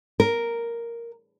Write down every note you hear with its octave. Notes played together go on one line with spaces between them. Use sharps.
A#4